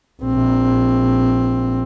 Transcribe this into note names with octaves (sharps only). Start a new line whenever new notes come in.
A#1 C4